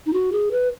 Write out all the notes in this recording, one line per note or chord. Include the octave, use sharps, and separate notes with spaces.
D#4
F#4
G#4
B4